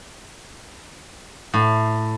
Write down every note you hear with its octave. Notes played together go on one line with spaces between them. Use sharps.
A2